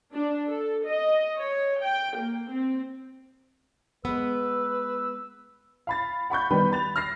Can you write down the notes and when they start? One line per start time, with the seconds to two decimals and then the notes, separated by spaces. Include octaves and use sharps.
0.13 D4
0.48 A4
0.86 D#5
1.38 C#5
1.81 G5
2.18 A#3
2.50 C4
4.05 G#3 B3 B4 E6
5.87 F5 B5 A6
6.30 F#5 B5 C#6 G6
6.51 D#3 G3 B3 B4 B5
6.72 B5 A6 F7
6.96 F6 A#6 C7